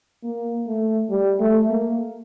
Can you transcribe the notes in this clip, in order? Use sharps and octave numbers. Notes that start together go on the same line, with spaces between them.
A#3
A3
G3
A3
A#3